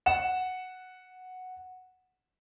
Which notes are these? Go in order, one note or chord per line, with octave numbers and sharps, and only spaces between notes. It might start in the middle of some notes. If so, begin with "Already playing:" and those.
F#5 E7